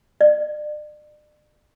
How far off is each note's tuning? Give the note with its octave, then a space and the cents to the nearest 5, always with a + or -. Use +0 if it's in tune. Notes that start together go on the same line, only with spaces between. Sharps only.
D5 +40